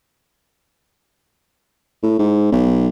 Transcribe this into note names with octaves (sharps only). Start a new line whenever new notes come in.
A2
G#2
B1